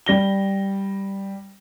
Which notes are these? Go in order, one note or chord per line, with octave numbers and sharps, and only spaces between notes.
G3 A#6 G7